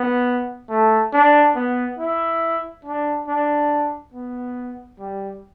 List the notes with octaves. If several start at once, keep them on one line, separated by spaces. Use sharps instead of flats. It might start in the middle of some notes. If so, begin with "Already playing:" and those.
Already playing: B3
A3
D4
B3
E4
D4
D4
B3
G3